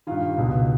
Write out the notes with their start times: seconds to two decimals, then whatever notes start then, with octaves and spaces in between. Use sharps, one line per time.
0.07 G2 D#3 F4
0.37 C#2 B2